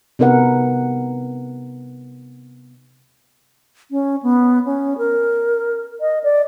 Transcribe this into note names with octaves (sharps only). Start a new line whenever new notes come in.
C3 B3 D#4 A#4 B4 F#5
C#4
B3
C#4
A#4
D#5
D5